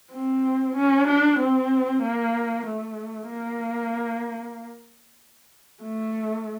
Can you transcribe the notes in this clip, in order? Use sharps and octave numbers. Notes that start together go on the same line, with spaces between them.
C4
C#4
D4
C4
A#3
A3
A#3
A3